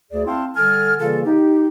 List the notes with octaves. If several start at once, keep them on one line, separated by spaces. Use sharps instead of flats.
D2 G#4 D5
C4 E4 F5 G5 A5 C6
D3 G3 A4 G#5 F6
C#3 E3 G3 A#3 F4 A4
D#4 G4